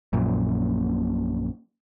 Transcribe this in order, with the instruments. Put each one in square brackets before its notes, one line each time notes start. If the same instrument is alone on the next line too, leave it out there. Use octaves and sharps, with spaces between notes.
[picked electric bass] A#1 F#2 A#2